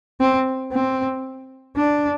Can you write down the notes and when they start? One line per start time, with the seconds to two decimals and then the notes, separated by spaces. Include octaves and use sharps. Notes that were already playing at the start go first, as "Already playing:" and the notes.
0.20 C4
0.73 C4
1.77 D4